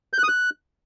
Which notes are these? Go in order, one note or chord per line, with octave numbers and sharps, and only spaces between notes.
G6
F#6
D#6
F#6